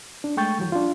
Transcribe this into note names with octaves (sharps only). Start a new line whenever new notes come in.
D4
G#3 A3 G5 C#6 G6 A6
E3 F#3
D4 F4